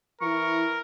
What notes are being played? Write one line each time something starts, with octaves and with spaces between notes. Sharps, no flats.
E3 E4 A#4 C#6